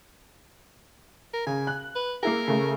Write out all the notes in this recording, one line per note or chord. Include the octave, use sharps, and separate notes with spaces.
A#4
C#3 G#5
F#6
B4
A#3 E4 G#4 A#4
C#3 A3